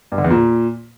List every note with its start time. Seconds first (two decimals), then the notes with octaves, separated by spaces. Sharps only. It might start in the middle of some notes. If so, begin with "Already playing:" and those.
0.12 G2
0.18 D3
0.24 E2
0.30 A#2